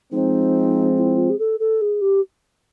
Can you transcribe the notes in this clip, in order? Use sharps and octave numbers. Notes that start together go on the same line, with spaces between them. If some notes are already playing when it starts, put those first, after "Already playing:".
F3 G#3 C4 D#4
E4
F4
G#4
A4
A4
G#4
G4